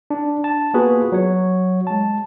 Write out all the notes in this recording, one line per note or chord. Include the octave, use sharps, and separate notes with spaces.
D4
A5
A#3 B3 F4 F#4 G#4 B4
F#3 C#5
G#3 A5